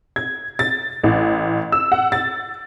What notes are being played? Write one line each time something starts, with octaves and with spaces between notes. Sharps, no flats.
G#6
A6
A1
E6
F#5
A6